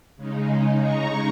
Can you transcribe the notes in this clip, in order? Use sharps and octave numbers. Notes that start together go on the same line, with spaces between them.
C#3 G#3 D#4
A#5 C#6